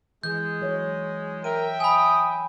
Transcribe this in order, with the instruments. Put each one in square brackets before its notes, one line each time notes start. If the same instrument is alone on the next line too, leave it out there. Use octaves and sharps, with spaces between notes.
[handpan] E3 [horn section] G#3 [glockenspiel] G6
[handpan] F#3 C#5 D#5
[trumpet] A#4 [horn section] E5 G5 [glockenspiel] D#7
[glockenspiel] G#5 B5 [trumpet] D#6